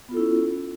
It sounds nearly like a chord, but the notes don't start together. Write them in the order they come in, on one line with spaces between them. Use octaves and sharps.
B3 F4 A4 E4 C#4